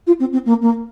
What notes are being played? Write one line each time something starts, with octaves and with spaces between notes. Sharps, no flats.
F4
C4
C4
A#3
A#3